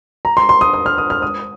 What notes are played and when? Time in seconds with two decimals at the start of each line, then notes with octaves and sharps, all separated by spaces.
0.25 A#5
0.37 C6
0.49 C6
0.61 D#6
0.73 D#6
0.86 F6
0.98 D#6
1.10 F6
1.22 D#6